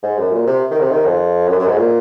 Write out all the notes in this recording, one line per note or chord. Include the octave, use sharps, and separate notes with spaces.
G#2
F#2
A#2
C3
D#3
C3
D#3
F2
F#2
F#2
G#2
A#2